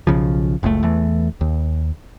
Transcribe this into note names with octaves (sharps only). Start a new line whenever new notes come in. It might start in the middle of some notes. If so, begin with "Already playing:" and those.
B1 C#3 F3
F#1 C#2 A#2 A3
E2 E3 A3
D#2